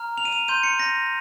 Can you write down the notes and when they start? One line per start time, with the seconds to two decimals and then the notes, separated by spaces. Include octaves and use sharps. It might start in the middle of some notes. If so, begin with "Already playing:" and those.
Already playing: A#5 F6
0.18 F7
0.25 D#7
0.32 F7
0.48 C6 G6 D#7
0.63 C#7
0.79 A#6